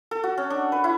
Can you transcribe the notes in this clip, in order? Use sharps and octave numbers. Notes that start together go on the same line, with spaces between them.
A4
F#4
C#4
D4
B4
E4